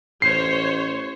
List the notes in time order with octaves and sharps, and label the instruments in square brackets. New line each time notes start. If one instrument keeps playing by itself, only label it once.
[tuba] A1 [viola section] C5 C#5 [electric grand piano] C7